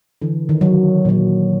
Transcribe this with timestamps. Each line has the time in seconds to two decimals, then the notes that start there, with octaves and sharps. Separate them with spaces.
0.22 D3 E3
0.49 D#3
0.61 F#3
1.05 A#2 F#3